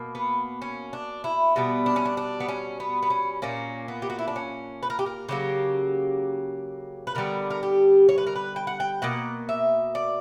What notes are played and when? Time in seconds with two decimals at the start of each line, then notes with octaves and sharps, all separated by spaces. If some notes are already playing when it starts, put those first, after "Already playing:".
Already playing: B2 A#3
0.15 B3
0.62 C#4
0.93 D4
1.24 E4
1.56 B2 G3 B3
1.86 D4
1.96 C#4
2.05 D4
2.17 D4
2.40 B3
2.49 C#4
2.80 B3
3.03 B3
3.10 C#4
3.42 A#2 A#3 C#4
3.88 B3
4.02 G4
4.10 F#4
4.19 E4
4.28 D4
4.36 C#4
4.83 B4
4.90 A#4
4.99 G4
5.06 A#4
5.29 C#3 F#3 A#3 G4
7.07 B4
7.15 D3 G3 B3 A#4
7.50 A#4
7.63 G4
8.09 C#5
8.18 B4
8.27 A#4
8.36 B4
8.56 G5
8.67 F#5
8.80 G5
9.02 B2 A#3 F#5
9.49 E5
9.95 D5